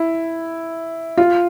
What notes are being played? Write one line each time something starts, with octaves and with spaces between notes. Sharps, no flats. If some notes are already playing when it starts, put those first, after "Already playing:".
Already playing: E4
F4